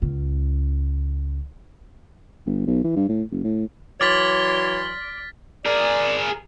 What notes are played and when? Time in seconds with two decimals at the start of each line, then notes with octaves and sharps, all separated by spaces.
0.02 C#2 C#4
2.46 G1
2.67 B1
2.84 E3
2.96 G2
3.09 A2
3.31 F#1
3.44 A2
4.01 E3 F#3 C#5 D5 C6 F6 A6 B6
5.66 G#4 A#4 D5